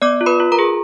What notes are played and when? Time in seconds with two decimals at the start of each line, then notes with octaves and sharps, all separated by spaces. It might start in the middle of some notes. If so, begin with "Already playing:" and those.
0.02 B3 D5 D6
0.21 F4
0.26 B4 B5
0.40 F4
0.52 A#4 A#5
0.59 G#4